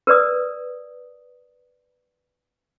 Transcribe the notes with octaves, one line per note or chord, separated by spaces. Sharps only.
A#4 B4 D5 D#6